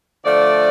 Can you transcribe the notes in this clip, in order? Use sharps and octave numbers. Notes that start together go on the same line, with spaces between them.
D3 F3 A3 D5